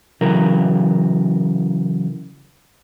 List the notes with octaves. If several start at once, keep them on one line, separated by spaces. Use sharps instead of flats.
C#3 E3 F#3 A#4